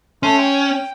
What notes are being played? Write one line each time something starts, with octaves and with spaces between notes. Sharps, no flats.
A3 C#4 C6
G5